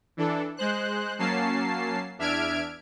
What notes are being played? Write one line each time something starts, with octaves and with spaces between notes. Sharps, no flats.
E3 D4 A4
G#3 C5 F#6
F#3 A#3 C#4 A5 C7
E2 D4 E5 F6 G#6 D7